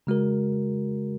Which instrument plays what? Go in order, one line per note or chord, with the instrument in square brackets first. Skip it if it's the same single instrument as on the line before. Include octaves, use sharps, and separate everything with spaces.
[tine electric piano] C#3 G#3 F#4 A#4